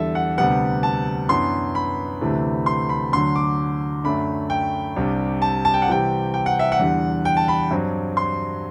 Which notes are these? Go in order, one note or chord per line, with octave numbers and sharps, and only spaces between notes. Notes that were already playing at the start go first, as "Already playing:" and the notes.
Already playing: E2 D3 G3 A4 E5
F#5
D2 C3 G3 B3 D4 F#5
A5
F#2 E3 B3 D4 C6
B5
D2 C3 E3 A3 D4
C6
B5
D2 D3 F#3 C6
D6
F#2 D3 A3 D4 B5
G5
C2 C3 G3 D4
A5
A5
G5
F#5
C3 E3 G3 C4 G5
G5
F#5
E5
F#5
E2 D3 G3
G5
A5
B5
G2 F#3 C4
C6